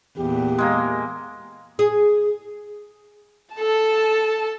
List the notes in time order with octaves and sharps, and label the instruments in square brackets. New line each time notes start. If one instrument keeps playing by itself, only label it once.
[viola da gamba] E2 A#2 [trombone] G4
[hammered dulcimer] G#3 A#3
[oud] G#4
[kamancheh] A4 A5